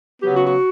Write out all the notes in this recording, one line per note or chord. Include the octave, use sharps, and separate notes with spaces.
C#3 F#3 B3 G4
F#4
F#4